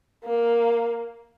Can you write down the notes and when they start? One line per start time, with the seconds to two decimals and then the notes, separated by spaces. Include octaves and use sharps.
0.24 A#3